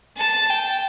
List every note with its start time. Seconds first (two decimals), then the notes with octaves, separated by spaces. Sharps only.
0.17 A5
0.50 G5